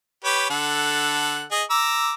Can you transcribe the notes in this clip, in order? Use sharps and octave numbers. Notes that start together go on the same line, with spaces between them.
G4 B4 C#5
D3 A4 F#5
G#4 D#5
A#5 D6 E6